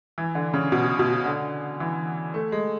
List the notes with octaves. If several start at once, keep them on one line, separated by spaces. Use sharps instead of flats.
E3
D3
C#3
B2
B2
D3
E3
A3
G#3